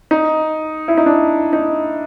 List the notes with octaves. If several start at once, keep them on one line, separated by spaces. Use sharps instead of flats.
D#4
E4
D#4
D4
D#4